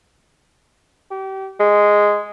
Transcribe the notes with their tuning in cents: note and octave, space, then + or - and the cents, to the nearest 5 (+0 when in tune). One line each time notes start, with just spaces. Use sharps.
G4 -30
G#3 -5